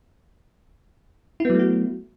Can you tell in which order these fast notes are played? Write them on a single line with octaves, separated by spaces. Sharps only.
E4 B3 F#3 A3 F#4